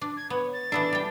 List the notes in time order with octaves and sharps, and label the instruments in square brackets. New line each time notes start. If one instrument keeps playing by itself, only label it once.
[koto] D4
[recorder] G#6
[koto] B3 [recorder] C#5
[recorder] A6
[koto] E3 B3 A4 [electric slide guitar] D4
[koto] G3 G5